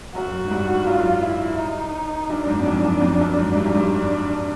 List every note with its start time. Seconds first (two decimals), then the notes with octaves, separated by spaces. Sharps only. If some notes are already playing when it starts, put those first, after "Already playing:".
0.15 F#2 F#4
0.45 G#2
0.51 G2
0.86 F#2 F4
1.22 E4
1.58 D#4
2.30 F#2 D4
2.47 G#2
2.59 F2
2.66 F#2
2.83 F#2
3.01 F2
3.20 F#2
3.37 G#2
3.55 G2
3.65 F#2
3.73 G2 D4